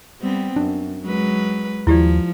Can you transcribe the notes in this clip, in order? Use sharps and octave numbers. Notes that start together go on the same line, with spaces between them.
G3 B3 C4
F#2 D4
F#3 G#3 B4
D#2 F3 E4 G4 D5